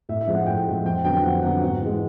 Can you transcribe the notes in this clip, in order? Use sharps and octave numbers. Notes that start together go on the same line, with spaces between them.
A2 E5
E5
F3 G#3
F#5
A2 G5
F3 G#3
F2 G5
D3 F#3 B3 G5
F2 F#5
D3 F#3 B3 F#5
G#2 F#5
E3 G#3